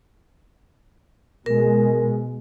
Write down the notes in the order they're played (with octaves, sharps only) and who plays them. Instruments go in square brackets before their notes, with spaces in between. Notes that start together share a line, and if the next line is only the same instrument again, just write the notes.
[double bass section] B2 G#3 [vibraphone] A#4